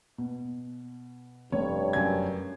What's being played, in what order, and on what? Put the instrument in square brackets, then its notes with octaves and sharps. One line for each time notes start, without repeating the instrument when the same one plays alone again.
[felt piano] B2
[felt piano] F1 [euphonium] G2 [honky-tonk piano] C#5
[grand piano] F#2 G#6